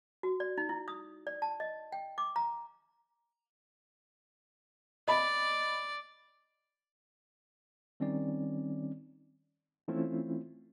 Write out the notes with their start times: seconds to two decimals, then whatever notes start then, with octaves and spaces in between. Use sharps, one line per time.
0.23 F#4
0.40 D5
0.58 D#4
0.69 E4
0.88 D#6
1.27 D5
1.42 A5
1.60 D#5
1.92 G5
2.18 D6
2.36 A#5
5.08 D5 D#5 B5
8.00 D#3 G3 C4 C#4 D#4 D5
9.88 E3 A3 C4 C#4 E4 F4